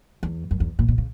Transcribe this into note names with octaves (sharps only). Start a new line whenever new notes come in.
E2
F#2
E2
A#2
B2
C#3